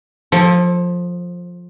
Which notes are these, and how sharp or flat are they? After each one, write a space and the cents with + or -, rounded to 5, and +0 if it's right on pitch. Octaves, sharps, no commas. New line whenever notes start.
F3 +15 A4 +0 C#5 -45